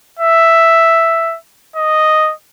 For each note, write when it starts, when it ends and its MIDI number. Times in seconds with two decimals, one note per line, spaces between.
0.19 1.37 76
1.76 2.33 75